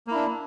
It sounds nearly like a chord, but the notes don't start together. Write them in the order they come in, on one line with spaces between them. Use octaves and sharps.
A#3 E4 D4